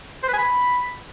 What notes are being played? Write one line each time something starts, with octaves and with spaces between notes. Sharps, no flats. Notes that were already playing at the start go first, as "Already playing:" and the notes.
C5
B4
G#5
B5